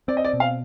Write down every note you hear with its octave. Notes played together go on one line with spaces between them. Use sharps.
C4 D5
D#5
D5
B2
F5